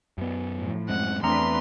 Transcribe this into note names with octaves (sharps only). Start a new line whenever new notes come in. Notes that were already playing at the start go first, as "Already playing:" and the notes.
F#2 B3
A2 F3
F#2 G#3 C4 F#5
E2 A3 C4 D4 B4 A#5 C6